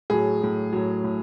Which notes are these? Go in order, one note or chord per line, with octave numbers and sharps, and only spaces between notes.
A2 F#3 G#4
A2 F#3
A2 F#3
A2